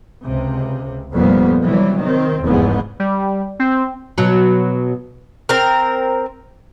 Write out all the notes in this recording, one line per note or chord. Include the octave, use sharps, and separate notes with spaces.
C#2 C3
F1 F2 A#2 G3 B3
C3 E3 F#3 G3
D#3 C4
F1 E2 G#2 B3
G3
C4
B2 F#3
C4 A#4